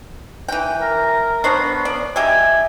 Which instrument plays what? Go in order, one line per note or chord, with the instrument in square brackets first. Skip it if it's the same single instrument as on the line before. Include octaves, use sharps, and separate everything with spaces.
[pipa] E3 G5
[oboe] A#4
[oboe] B3 [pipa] D4 C5 C#5
[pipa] D5
[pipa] G4 D#5 E5 [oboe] G#5